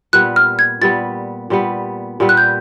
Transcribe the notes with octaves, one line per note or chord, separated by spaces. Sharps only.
A#2 G3 B3 F#6
F6
G#6
A#2 G3 B3 A6
A#2 G3 B3
A#2 G3 B3
F#6
G6